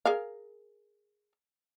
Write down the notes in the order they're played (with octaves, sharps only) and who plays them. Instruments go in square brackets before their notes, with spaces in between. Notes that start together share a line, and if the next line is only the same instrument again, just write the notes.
[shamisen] G#4 A#4 F5